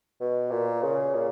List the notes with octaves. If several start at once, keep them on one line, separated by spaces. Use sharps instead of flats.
B2
A#2
C#3
A#2